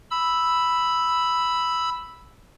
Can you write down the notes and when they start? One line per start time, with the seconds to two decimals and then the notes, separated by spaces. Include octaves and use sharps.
0.11 B5 E6